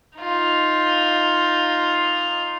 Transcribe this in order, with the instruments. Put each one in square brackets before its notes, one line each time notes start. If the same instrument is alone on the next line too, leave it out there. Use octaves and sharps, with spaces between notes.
[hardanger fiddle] D#4 F4